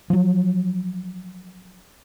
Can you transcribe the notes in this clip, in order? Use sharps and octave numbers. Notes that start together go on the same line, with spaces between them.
F3 F#3